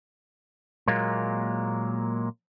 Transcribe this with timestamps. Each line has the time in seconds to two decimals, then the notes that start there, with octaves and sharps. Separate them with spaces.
0.88 A#2 F#3 G#3 A#3